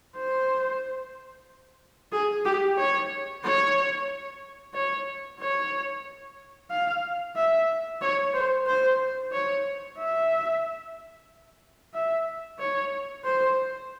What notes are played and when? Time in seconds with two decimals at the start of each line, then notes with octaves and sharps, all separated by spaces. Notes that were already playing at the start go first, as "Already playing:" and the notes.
0.16 C5
2.12 G#4
2.45 G4
2.77 C#5
3.44 C#5
4.74 C#5
5.39 C#5
6.70 F5
7.36 E5
8.01 C#5
8.33 C5
8.67 C5
9.32 C#5
9.98 E5
11.93 E5
12.59 C#5
13.24 C5